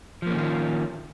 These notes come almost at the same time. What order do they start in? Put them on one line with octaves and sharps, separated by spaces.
F3 A#3 C#4 D#3 F4